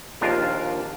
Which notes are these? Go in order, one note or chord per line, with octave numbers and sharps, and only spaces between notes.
A#1 D#2 D4 F4 A#4